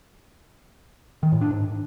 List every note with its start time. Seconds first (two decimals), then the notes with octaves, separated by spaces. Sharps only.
1.23 D#3
1.32 A2
1.41 D4
1.51 G#2